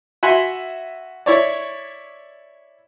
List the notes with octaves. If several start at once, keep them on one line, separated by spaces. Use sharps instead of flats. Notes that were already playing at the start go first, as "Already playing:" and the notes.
F#4 E5 F#5 G#5 B5 C6
E4 C#5 D5